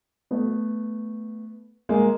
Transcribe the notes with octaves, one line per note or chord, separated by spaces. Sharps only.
A3 B3
G#3 A#3